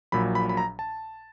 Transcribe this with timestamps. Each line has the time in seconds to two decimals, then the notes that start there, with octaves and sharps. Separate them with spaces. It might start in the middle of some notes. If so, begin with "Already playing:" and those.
0.12 A#1 A#2 F#3 B5
0.35 B5
0.49 B5
0.57 A#5
0.79 A5